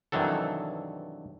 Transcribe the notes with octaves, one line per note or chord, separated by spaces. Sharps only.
G2 C3 D#3 E3 F#3 A4